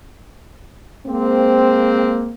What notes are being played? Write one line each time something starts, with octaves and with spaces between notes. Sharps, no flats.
G#3 A#3 C4